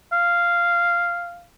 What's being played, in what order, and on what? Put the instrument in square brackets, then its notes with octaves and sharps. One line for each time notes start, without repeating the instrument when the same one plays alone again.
[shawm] F5